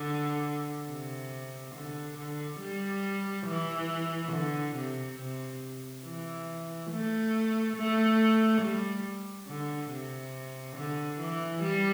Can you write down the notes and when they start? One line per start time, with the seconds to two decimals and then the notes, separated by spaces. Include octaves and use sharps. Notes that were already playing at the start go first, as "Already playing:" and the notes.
Already playing: D3
0.90 C3
1.75 D3
2.18 D3
2.61 G3
3.47 E3
4.32 D3
4.76 C3
5.19 C3
6.05 E3
6.91 A3
7.76 A3
8.61 G3
9.48 D3
9.91 C3
10.77 D3
11.20 E3
11.63 G3